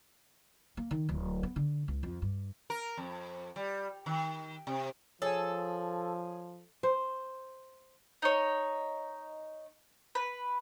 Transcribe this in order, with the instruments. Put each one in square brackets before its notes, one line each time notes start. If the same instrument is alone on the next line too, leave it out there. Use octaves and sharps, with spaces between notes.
[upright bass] A#3
D#3
D1
B3
D3
C#2
F2
G2
[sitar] A#4
F2
G3
D#3
C3
[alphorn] F3 [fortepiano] G#4 G#5 [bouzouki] A4 [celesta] C#5
[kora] C5
[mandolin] D#4 C#5
B4